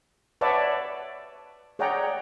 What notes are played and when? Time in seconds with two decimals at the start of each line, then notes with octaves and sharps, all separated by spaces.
0.41 B4 C#5 D5 E5 F#5 A5
1.79 G#4 C#5 D5 F#5 G5 A#5